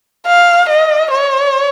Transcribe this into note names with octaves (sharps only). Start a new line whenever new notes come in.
F5
D#5
C#5